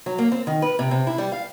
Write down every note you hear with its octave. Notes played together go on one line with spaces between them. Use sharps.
F#3
A#3
C4
D#3
B4
C3
C3
E4
G3
F5